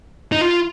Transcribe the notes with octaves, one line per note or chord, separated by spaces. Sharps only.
D#4
F4